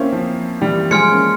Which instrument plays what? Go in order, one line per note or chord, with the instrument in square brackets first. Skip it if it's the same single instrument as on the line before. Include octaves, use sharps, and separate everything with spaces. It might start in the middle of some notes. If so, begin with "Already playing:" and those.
Already playing: [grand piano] A#3 C4 C#4 E4
F3
E3 G3
[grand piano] F3 G#3 [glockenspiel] G#5 C6 F6 G#6 C#7
[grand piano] A#3 C#4